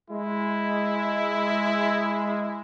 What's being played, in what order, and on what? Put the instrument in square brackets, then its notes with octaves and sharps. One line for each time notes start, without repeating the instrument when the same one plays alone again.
[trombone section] G#3 [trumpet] E4